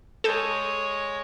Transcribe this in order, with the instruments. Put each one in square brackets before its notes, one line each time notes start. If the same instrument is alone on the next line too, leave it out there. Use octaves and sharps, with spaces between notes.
[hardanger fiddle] G#3 C#5 [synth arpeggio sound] A4 A5 G6